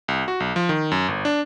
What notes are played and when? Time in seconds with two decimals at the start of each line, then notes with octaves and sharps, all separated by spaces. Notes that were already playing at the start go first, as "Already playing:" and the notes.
0.08 C2
0.28 F#4
0.40 B1
0.56 F3
0.69 D#3
0.91 F#2
1.08 G1
1.25 D4